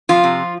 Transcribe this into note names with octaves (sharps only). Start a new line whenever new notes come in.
C3 F3 F4
C3